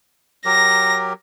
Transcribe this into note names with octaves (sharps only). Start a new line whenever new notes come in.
F#3 G4 A#4 A#6